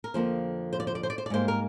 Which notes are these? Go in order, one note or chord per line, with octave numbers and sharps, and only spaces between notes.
A#4
F2 D3 F3 A#3 C5
C5
D5
C5
D5
C5
D5
C5
D5
G#2 G3 A#3 C5
A#4